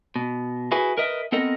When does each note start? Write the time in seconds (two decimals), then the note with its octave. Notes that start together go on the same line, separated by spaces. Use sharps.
0.16 B2
0.72 E4 F#4 G#4 B4 G#5
0.98 A#4 B4 D#5 E5
1.32 B3 C4 A4 A#4 D#5